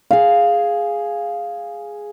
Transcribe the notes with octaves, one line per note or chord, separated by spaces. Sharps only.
G#4 F5